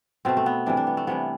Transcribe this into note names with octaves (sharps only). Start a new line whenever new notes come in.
B2 A3 C4
A3
B3
C3 E3 G3 D4
D4
B3
A3
C3 E3 G3 B3